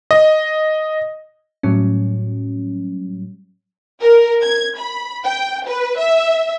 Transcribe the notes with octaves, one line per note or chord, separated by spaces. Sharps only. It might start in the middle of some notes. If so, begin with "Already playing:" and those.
D#5
A2 F#3 G3 C#4
A#4
G#6
B5
G5
B4
E5